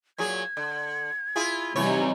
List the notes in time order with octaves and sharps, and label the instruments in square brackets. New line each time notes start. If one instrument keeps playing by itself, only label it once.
[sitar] A#2 F#3 G#4 [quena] G#6
[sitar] D3
E4 F4 G#4
[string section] C3 G3 D#4 [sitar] E3 F#3 C#5